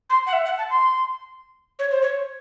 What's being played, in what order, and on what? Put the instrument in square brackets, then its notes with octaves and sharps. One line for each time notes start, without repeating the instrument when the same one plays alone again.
[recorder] C6
F#5
E5
F#5
A5
C6
C#5
C5
C#5